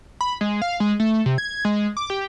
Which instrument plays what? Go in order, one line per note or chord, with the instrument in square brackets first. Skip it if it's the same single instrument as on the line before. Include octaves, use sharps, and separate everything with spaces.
[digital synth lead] B5
G#3
F5
G#3
A3
C3
G#6
G#3
D6
G4